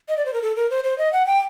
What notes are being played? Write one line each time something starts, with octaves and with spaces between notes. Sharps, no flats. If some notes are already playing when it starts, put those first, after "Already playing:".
D#5
D5
C5
A#4
A4
A#4
C5
C5
D#5
F#5
G5